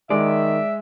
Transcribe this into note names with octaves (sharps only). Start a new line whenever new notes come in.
D#3 G#3 D5 E5